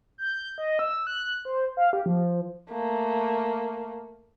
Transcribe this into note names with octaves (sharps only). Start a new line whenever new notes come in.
G6
D#5
E6
F#6
C5
F5
G4
F3
A3 A#3